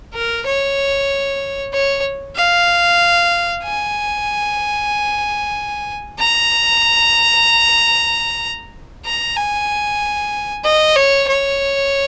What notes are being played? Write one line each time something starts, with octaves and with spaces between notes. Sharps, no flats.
A#4
C#5
C#5
F5
G#5
A#5
A#5
G#5
D#5
C#5
C#5